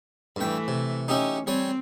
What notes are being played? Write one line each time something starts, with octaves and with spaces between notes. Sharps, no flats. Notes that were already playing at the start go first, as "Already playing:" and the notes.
G2 E3 A3 G5
C3
C#4 D#4 G4 E5
G3 C4 C#5 G#5